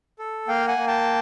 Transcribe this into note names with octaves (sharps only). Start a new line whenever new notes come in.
A4
A#3 F5 G5
F#5 G#5
A#3
G5 A5